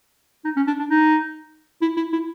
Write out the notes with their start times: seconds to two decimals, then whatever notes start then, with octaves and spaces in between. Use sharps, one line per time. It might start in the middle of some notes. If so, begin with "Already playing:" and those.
0.45 D#4
0.56 C#4
0.67 D4
0.79 D4
0.90 D#4
1.82 E4
1.97 E4
2.13 E4